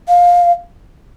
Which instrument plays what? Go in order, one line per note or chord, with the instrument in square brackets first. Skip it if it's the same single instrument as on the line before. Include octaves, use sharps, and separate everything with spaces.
[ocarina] F5